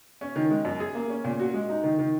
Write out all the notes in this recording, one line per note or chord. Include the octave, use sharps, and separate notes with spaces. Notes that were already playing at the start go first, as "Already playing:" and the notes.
C#4
D#3
G#3
F#2
G#4
A#3
C#4
A#2
F#4
G#3
D#4
D#3
D#3